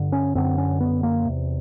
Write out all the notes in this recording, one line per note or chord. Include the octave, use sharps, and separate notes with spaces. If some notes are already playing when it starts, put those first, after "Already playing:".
Already playing: G2 D3
C#4
F#2 D3 C4
C#4
B3
A#3
E2 C3